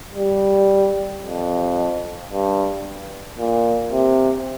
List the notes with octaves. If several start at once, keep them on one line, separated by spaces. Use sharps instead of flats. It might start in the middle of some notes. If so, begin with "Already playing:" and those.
G3
F2
G2
A#2
C3